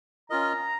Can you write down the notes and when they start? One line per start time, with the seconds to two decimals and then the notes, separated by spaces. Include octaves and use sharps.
0.30 C#4 F4 A#4 D#5 A#5